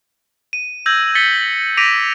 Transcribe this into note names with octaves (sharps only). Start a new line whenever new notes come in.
D#7
E6 G6 G#6 A#6 F#7
A6 B6 C#7 G7
D6 A#6 B6 D7 D#7 F7